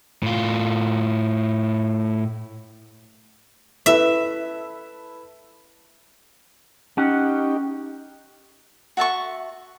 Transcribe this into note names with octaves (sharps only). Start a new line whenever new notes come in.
A2 F4
E4 A4 B4 E5
C#4 D#4 G4 F#5
F#4 E5 A5 C#6